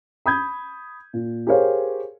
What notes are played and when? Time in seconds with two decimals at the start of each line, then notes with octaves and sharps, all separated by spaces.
0.26 B5 D#6 G6 G#6
1.13 A#2
1.47 G4 G#4 A#4 C5 C#5 F5